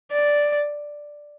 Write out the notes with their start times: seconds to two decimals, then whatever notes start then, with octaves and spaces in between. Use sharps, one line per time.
0.12 D5